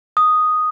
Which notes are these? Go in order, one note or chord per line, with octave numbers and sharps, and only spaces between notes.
D#6